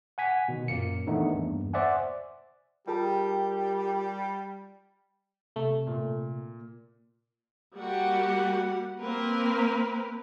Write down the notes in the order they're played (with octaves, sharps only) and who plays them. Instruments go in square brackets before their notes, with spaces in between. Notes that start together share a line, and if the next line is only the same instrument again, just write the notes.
[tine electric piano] F#5 G#5 B6
B2 D#3
F#2 A#2 A#3 C#7
D#3 E3 A3 B3 D4 D#4
E2 G2 A#3
C5 D5 E5 F#5 G#5
[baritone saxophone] G3 [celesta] F4 A5 [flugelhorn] G4 [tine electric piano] G#4 A#4 G5
[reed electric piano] C3 [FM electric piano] A3
[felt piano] A#2
[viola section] G3 A#3 F#4 G4 F#5
A#3 C4 A#4 B4